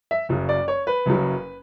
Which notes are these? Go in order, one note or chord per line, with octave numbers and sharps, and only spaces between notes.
E5
F#1 F#2 C#3 F#3
D5
C#5
B4
F#1 F#2 C#3 F#3